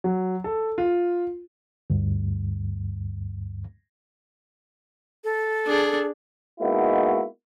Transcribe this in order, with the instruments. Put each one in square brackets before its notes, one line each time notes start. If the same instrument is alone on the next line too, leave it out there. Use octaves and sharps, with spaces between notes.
[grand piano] F#3
A4
F4
[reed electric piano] D2 G2
[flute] A4
[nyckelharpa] D4 G#4
[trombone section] G#3 A#3 B3 D#4 E4 F#4